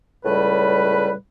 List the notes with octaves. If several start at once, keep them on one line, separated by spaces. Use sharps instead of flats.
C#2 A2 G3 B4